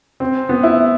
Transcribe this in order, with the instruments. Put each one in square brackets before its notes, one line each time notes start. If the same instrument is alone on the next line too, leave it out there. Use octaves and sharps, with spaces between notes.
[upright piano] C4
B3
E4